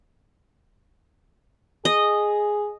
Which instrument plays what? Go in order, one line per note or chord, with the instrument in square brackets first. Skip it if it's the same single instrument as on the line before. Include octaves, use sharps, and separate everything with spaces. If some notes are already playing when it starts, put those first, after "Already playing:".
[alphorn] G#4 [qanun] D#5